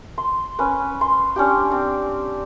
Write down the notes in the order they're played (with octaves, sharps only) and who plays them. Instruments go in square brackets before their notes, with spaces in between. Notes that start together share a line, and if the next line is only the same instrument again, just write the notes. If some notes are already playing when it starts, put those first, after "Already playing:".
[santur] C6
C#4 B4
C6
C#4 D4 G4
C4